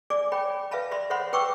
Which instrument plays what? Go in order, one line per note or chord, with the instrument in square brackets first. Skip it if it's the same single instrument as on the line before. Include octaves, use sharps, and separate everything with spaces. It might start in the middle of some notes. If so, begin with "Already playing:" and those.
[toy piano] D5 G#5 D6
C#5 G5 B5
B4 E5 F5 A5 B5
D5 E5 B5 C6
C5 C#5 E5 F#5 B5 C6
B4 G5 B5 C#6 D6 E6